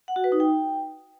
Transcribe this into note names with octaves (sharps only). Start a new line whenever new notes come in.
F#5
F#4
B4
D#4
G5